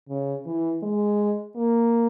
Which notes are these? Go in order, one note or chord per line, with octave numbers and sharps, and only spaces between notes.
C#3
E3
G#3
A#3